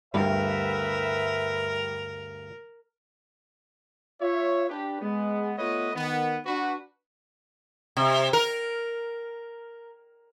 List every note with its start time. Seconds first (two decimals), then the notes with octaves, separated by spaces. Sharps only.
0.14 D2 G2 G3 A#4 B4 E5
4.20 F4 C#5 E5
4.69 D4 G4 B4
5.01 G#3 B3
5.58 A3 B3 F4 B4 C#5 D#5
5.94 D#3 B3
6.46 D4 F#4 B4
7.97 C3
8.33 A#4